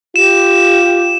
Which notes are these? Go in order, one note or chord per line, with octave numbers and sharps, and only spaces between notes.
F4 G4 E7